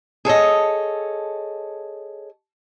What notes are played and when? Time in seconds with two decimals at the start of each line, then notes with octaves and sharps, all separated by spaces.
0.25 G#4 A4 C#5 D#5